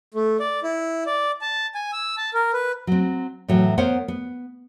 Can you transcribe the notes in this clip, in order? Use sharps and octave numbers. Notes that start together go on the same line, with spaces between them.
A3
D5
E4
D5
A5
G#5
E6
A5
A#4
B4
F#3 C4
A2 E3 F#3
B3 A#4 C5 C#5 F#5
B3